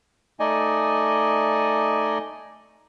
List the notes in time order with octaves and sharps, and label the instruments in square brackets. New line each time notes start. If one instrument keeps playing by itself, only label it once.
[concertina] A3 D#4 D5 D#5 G#5